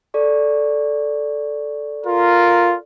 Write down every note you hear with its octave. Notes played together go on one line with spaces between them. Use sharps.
A4 D5 C#6
F4 A#4